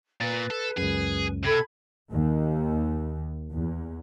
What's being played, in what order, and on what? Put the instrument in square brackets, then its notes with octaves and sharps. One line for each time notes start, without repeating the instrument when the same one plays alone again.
[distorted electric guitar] A#2 [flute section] B4 [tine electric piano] A6
[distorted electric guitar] A4
[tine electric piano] C#2 F#2 [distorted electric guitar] G#4
[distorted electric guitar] C3 [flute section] A4 B5 G#6
[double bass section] D#2
E2